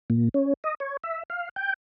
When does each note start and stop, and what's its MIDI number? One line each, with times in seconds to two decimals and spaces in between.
0.10 0.29 46
0.34 0.53 61
0.64 0.75 75
0.80 0.97 73
1.04 1.23 76
1.30 1.49 77
1.56 1.73 79